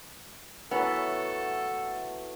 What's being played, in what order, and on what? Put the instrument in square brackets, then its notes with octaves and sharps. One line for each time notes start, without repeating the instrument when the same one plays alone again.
[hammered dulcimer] E3 F#3 A3 [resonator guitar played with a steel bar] B3 [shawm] A4